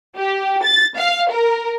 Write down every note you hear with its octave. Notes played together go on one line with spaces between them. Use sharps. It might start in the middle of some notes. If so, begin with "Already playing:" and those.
G4
A6
F5
A#4